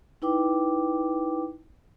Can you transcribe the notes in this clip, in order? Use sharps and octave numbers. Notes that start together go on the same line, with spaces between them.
D#4 E4 B4 G5 D6